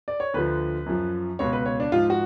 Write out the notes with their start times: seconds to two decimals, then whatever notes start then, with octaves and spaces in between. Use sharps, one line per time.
0.08 D5
0.20 C#5
0.34 D2 D3 F3 B4
0.86 F#2 F3
1.39 C#2 B2 C#5
1.53 B4
1.66 C#5
1.80 D4
1.92 G#2 F3 F4
2.10 F#4